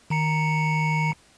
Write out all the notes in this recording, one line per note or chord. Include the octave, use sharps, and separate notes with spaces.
D#3 A#5 C#7